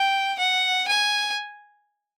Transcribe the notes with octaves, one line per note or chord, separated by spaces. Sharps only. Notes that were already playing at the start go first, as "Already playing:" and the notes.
Already playing: G5
F#5
G#5